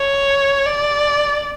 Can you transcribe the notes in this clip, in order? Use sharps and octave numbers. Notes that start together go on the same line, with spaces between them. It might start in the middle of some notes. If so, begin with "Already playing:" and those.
Already playing: C#5
D5